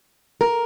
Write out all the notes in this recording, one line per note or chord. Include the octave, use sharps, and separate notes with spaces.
A#4